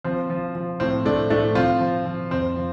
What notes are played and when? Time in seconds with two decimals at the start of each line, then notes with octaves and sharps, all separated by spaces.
0.04 F3 C4
0.30 F3
0.55 F3
0.80 A2 C4
1.05 A2 A3 D4
1.30 A2 A3 D4
1.55 F3 C4 F4
1.80 F3
2.06 F3
2.31 F2 C4
2.56 F3